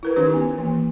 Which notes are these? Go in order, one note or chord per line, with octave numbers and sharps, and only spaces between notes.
E4 A#4 B4
D#3 C#4 D#4 G4 B4
B3
E3 A#3